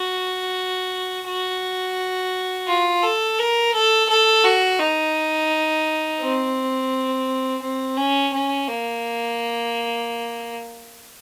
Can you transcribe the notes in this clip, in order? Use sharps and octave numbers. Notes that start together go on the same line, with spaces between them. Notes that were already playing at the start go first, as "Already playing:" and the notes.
Already playing: F#4
F#4
F4
A4
A#4
A4
A4
F#4
D#4
C4
C4
C#4
C#4
A#3